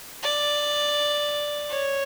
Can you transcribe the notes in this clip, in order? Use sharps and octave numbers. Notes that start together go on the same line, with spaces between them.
D5
C#5